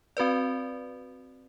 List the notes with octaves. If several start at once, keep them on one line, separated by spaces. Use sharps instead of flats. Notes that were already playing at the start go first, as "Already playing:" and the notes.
C4 F#4 B4 D5